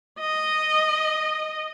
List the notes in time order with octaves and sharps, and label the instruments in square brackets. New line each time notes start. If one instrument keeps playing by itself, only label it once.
[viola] D#5